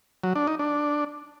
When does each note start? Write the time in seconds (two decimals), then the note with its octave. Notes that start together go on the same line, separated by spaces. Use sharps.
0.24 F#3
0.35 D4
0.47 D#4
0.59 D4